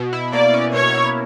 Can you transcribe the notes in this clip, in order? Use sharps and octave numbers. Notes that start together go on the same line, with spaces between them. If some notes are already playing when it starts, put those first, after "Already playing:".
Already playing: B2
E4
A#3 D5
C#4
B2 C#5
E4